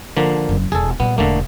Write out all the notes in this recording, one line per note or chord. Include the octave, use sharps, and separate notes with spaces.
D3 F3 A#3
F#1 F#2
E1 G#4 A4
A#2 G3 B3
E1 D3 A3 A#3